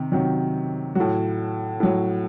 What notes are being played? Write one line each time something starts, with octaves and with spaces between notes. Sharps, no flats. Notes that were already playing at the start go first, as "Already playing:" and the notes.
Already playing: C3 D#3
C3 D#3 F#3
A2 F#3 F#4
A2 F#3